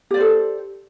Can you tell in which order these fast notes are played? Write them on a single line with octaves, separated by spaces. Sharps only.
G4 D5 C5 A4